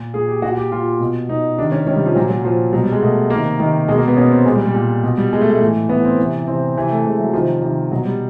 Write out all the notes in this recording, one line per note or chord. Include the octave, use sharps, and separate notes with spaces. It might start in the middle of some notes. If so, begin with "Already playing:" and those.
Already playing: A#2
A#2 G#4
G4
A#2 F#4
G4
A#2 F4
B2
B2 D#4
C3 D#3 D4
C#4
C3 D#3 C#4
G3
F3
A#2 F#3
F#3
A#2 F3
B2 F#3
G3
G#3
B2 A3
C3 D#3 A#3
C3 D#3 A#3
B2 G#3
A#3
B3
B2 C#4
C4
A#2 G#3
G3
G3
A#2
B2
G3
B2 G#3
A3
A3
A2 E3
A2 E3 B3
C4
C3 E3
C3 E3 C4
C3 E3
A3
C3 E3 G#3
F#3
C3 D#3 F3
C3 D#3
B2 F#3
G3